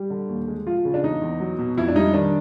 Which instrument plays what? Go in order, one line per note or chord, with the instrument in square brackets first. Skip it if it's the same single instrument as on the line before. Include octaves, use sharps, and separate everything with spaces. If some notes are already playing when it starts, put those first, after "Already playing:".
Already playing: [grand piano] G3 G4
D3
D#2
G#3
F3 F4
C#3
D4
E2 D#4
E2
F#3
B2
F2 E4
D4
G3 D#4
D#3 D4